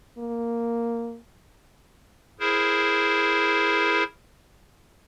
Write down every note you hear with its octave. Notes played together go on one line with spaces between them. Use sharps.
A#3
E4 G#4 A#4 C5